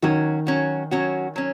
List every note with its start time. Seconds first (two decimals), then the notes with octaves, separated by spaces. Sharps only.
0.02 D#3 F#3 C#4 F#4
0.47 F#3 C#4 F#4
0.91 F#3 C#4 F#4
1.36 F#3 C#4